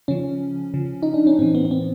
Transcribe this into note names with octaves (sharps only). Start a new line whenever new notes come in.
C#3 F3 C#4
C#3 F3
D#4
D4
C#4
A2 E3 C4
B3
B3
C4